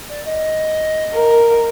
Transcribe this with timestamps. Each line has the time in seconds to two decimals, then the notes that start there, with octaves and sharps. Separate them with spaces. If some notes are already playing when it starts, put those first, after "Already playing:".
0.09 D5
0.25 D#5
1.14 A#4